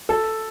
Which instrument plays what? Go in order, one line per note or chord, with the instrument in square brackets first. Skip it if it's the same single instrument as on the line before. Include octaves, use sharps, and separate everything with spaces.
[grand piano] A4